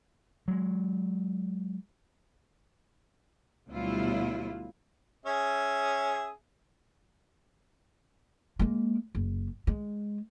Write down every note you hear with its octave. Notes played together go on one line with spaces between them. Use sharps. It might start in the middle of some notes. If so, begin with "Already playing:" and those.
F#3 G#3
D2 B2 F#3 G3 E4 F4
C#4 G#4 E5
G#3 A#3
F#1
G#3